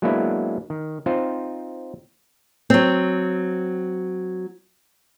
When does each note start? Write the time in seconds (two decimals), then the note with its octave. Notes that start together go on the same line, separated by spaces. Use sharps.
0.02 F#3 G#3 A#3 B3 D4 E4
0.70 D#3
1.06 C4 D#4 F4 C5
2.70 F#3 C4